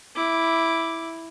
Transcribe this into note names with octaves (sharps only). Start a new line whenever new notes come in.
E4 D6